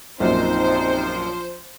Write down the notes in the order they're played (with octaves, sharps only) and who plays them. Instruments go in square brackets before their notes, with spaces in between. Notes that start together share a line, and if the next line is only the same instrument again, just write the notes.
[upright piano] A#1 F#2 A#2 [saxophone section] F3 [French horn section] C4 D#4 [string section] C5